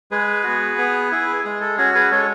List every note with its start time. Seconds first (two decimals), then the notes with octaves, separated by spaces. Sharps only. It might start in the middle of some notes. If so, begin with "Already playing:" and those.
0.11 G#3 G#4 B4
0.44 B3 F#4
0.78 B3
1.12 E4 G#4
1.44 G#3 G#4
1.61 A4
1.77 C#4 F#4 G#4
1.95 G#4 B4
2.11 G#3 A4 C#5